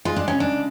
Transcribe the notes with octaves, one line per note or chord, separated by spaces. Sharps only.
G#3 F4
D4
C#3 C#4
D4